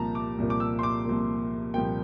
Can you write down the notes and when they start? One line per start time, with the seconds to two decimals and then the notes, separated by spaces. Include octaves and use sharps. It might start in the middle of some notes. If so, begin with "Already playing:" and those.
Already playing: C2 A#2 F3 A#3 A5 A#5
0.15 D6
0.38 C2 A#2 F3 A#3
0.50 D6
0.60 E6
0.79 C6
0.83 D6
1.05 C2 A#2 F3 A#3
1.74 C2 A#2 F3 A#3 G5